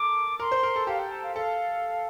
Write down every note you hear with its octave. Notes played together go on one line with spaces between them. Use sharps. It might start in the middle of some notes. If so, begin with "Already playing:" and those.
Already playing: A4 A#4 D6
A#4 C6
C5
A#4
A4
G4 F5
G5
A5
F5
A4 F5